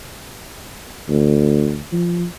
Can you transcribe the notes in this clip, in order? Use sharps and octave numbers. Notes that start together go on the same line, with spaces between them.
D2
F3